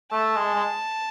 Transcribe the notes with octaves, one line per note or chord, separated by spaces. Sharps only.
A3 A5
G#3
G#3